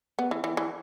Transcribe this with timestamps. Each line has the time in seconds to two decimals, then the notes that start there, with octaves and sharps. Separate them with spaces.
0.19 B3
0.31 E3
0.44 E3
0.57 E3